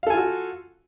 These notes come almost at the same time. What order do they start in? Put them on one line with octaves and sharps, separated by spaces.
F5 A4 G#5 F4 F#4